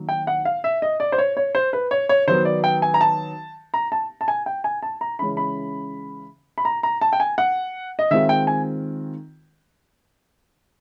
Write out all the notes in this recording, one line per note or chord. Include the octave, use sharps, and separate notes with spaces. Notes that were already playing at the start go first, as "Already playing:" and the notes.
Already playing: D#3 F#3 A#3
G5
F#5
F5
E5
D#5
D5
C5
C#5
C#5
C5
B4
C#5
C#5
D#3 F#3 B3 C5
D5
G5
G#5
A#5
A5
A#5
A5
A5
G#5
G5
G#5
A5
A#5
C#3 E3 G#3 C#4 B5
B5
B5
A#5
A#5
A5
G5
G#5
F#5
D#5
D#3 G#3 C4 F4 E5
G5
G#5